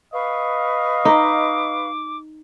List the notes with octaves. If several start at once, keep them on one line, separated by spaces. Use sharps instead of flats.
B4 D#5 F5 C#6
D#4 D6